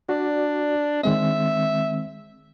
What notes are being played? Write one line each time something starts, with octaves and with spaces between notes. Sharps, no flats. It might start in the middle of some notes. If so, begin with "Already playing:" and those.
D4 F#4 D5
D#3 G#3 C4 E5